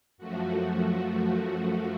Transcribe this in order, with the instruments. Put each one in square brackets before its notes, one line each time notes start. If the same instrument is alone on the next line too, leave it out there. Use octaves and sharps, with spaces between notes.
[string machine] F#2 F3 A3 F#4